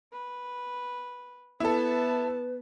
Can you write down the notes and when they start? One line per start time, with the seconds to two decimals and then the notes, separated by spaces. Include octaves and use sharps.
0.12 B4
1.60 B3 E4 A4 B4 A5